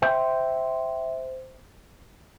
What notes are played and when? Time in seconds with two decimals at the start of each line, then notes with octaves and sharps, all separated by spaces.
0.02 C5 E5 G5